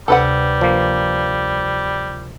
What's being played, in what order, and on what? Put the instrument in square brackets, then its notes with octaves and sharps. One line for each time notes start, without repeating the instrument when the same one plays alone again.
[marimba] D2 C3 [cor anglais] G3 [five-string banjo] A4 B4 F#5
[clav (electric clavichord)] F3 A#3